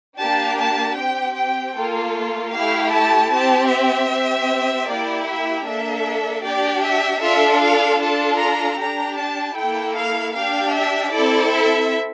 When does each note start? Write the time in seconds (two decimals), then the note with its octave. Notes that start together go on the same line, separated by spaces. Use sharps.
0.19 A#3 D4 G4 A5
0.57 A5
0.97 C4 G4 G5
1.37 G5
1.76 A#3 F4 A4
2.54 A3 E4 G4 F5
2.92 A5
3.32 C4 G4 A5
3.70 E5
4.10 C4 G4
4.88 A#3 E4 G4 D5
5.27 E5
5.66 A#3 D4 A4 E5
6.44 D4 G4 D5
6.84 E5
7.22 D4 F4 A4 E5
7.62 F5
8.00 D4 F4 A4 A5
8.40 A#5
8.79 D4 G4 A#5
9.19 A5
9.57 A#3 E4 A4 G5
9.97 F5
10.35 D4 G4 F5
10.74 E5
11.13 C4 E4 A4 D5
11.52 E5